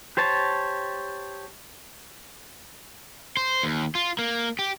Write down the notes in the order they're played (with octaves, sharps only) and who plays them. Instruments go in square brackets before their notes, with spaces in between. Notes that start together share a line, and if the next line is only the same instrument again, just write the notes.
[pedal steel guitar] G4 C5 C#5 A5
[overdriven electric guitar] C5
D#2
F4
A#3
G4